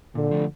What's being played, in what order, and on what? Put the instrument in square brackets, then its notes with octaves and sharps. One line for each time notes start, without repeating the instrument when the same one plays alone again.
[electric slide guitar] A#2 [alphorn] D3
[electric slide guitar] F3 A3